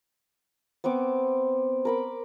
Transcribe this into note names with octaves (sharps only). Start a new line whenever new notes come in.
B3 C4 C#6 D6
A#4 B5 D6